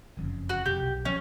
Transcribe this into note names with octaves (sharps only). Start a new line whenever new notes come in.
F#1 F2 C#3
F#4
F2 C3 G4
B1
F3 F#3 C#4